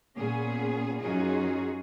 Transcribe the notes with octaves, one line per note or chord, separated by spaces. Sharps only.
A#2 B3 C#4 G#4
F#2 C#4 D#4 F4 F#4 G#4